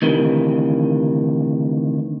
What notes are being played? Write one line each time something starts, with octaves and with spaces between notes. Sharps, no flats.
D2 C3 D#3 E3